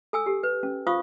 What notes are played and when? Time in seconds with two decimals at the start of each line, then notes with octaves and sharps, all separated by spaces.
0.13 A4 G#5 E6
0.26 G4 A4
0.43 B4
0.63 C#4
0.87 F4 C5 F5 C#6 D#6